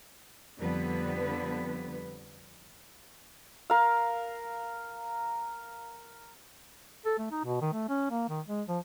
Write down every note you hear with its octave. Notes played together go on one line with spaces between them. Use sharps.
F2 D3 G3 B3 B4
A#4 F5
A4
A3
D#4
B2
D#3
A3
C#4
A#3
D#3
G#3
F3